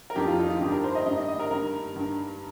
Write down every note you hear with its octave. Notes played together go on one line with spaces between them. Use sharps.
A#4
F2 D#3 G4
F4
D#4
F4
G2 D#3 G4
A#4
C5
D#5
G2 D#3 D#5
D#5
D#5
A#4
G2 D#3 A#4
G2 D#3